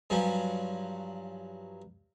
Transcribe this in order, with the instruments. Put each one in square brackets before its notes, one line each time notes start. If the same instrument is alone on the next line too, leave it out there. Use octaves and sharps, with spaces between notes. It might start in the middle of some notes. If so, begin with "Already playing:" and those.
[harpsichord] G2 F3 F#3 C#4